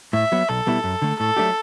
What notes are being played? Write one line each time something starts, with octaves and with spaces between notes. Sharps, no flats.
A2 E5
F#3 B3
B1 A4
B2 G3 B3 E4
F#2
D3 A3
A2 A4
F#3 A3 D4 G4